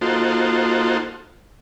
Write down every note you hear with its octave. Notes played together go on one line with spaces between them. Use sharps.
A#3 D#4 F4 F#4 A4 C5